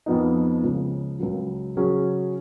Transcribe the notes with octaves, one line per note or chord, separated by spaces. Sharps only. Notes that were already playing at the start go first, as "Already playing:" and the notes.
F2 F3 B3 D#4
C#2 C#3 F3
C#2 C#3 F#3
C#3 F#3 C#4 G#4